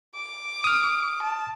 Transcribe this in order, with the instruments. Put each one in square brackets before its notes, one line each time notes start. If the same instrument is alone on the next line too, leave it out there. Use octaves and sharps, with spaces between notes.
[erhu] D6
[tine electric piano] D#6 F6
[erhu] A5